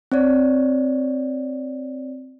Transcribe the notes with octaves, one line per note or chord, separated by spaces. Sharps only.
C4 C#5 D5